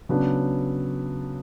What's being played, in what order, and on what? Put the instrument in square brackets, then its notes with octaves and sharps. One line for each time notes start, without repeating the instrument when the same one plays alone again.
[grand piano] C#3 F#3 B3 D4